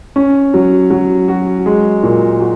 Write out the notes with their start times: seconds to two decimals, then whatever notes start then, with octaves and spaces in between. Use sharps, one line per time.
0.16 C#4
0.54 F#3
0.90 F#3
1.28 F#4
1.66 G#3
2.03 A#2
2.40 F#4